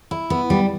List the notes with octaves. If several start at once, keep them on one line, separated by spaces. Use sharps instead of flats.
E4
B3
G3